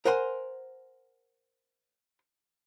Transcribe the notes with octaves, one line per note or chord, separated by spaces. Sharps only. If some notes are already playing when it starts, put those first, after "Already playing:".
A#4 C5 F#5 G#5 C6